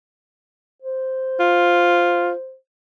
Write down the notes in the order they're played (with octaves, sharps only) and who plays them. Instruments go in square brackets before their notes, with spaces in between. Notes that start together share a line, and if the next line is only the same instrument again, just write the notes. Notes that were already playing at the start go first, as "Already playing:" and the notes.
[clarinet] C5
[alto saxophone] F4